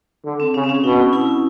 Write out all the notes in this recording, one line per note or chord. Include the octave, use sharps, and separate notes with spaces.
D3
C4
C#3 C#4
C4
C#4
B2 D#4
E4